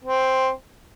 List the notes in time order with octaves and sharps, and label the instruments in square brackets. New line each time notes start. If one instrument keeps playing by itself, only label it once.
[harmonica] C4